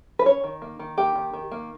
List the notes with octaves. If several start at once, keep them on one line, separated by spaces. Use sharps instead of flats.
B4
C#4 C#5
D#3
A#3
D#3
A#3 G4
D#3
D#3
A#3